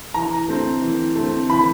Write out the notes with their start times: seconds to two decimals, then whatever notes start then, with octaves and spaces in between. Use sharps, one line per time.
0.14 E3 A#5
0.49 A3 C4
0.82 E3
1.16 A3 C4
1.50 E3 B5